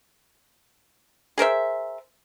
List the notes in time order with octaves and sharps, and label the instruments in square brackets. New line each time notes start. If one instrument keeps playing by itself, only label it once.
[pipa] G#4 A#4 C5 E5